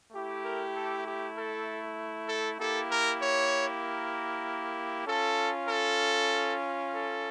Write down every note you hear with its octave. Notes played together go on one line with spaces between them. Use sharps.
A3 E4 G4
A#4
A4
G4
A4
A4
A#3 E4 G4 A4
A#4
C#5
A#4
C#4 F4 A4
A4
A4